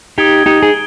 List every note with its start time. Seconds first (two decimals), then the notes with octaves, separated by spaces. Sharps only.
0.18 D#4 G4 D#6 G#6 D7 G7
0.46 D#4 G4
0.63 G#4